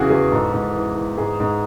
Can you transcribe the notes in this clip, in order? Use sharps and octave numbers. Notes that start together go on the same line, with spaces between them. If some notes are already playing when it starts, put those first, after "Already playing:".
Already playing: E2 C#3 E3 F#4 G#4
E2 G#4
G#2 A4
G#2
E3
E3
G#2 G#4
G#2